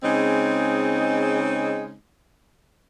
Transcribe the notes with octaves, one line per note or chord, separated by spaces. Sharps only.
C#3 G#3 C4 D#4